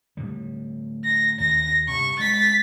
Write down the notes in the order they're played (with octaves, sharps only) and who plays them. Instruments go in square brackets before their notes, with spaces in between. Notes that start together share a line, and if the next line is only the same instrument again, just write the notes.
[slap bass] A2 D3 G3
[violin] A#6
[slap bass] D#2 [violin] A#6
[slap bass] G2 C3 [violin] C#6
[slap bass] G#3 [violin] A6 B6